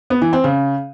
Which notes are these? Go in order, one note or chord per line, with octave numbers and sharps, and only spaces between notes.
B3
E3
C4
C#3